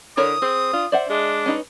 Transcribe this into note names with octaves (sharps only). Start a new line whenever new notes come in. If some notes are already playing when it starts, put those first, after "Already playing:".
D3 E4 A#4 C#5 D#6
C4 G#4
D4 F4
C5 D5 E5 F#5
G#3 D4
C#4 D#4 B4